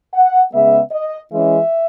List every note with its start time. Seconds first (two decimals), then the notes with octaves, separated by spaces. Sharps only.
0.14 F#5
0.52 C#3 G#3 B3 E5
0.92 D#5
1.31 E3 G#3 C#4 E5